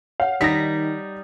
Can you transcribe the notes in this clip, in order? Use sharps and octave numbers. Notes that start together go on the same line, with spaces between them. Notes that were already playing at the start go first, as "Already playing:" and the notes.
C#5 F5 F#5
D#3 G3 D#4 A#6 B6